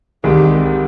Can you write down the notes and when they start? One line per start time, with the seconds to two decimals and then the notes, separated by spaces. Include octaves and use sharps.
0.24 C2 C3 D#3 G#3 G4